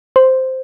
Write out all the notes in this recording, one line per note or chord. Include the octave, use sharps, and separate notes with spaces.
C5